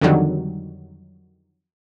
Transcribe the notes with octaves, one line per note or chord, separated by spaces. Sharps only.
F2 D3 D#3 F#3 G3